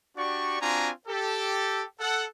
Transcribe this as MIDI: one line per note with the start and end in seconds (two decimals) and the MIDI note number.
0.17 0.61 62
0.17 0.61 66
0.17 0.61 67
0.17 0.61 74
0.17 0.61 85
0.61 0.90 60
0.61 0.90 62
0.61 0.90 65
0.61 0.90 66
0.61 0.90 80
0.61 0.90 82
1.08 1.84 67
1.08 1.84 69
2.00 2.25 69
2.00 2.25 78